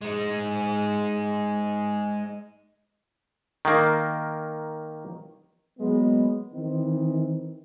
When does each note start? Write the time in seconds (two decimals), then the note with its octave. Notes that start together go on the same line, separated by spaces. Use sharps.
0.02 G#3 D#4
3.65 D#3 A#3
5.79 F#3 G#3 A#3 B3
6.52 D#3 E3 C4